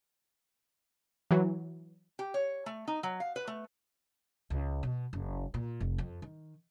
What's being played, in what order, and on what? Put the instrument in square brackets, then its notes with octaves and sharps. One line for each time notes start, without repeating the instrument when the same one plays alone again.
[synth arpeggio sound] E3 F#3
[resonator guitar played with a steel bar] G4
C#5
A3
D#4
F#3
F5
B4
A3
[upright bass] C#2
B2
F#1
A#2
F1
F2
D#3